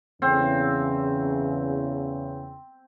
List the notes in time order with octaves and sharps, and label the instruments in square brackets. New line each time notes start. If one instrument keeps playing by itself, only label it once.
[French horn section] E2 C#3 [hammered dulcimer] C4